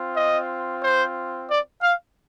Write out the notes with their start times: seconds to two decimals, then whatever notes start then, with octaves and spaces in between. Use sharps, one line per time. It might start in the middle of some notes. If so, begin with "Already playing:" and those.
Already playing: C4 F4
0.16 D#5
0.82 C5
1.49 D5
1.82 F5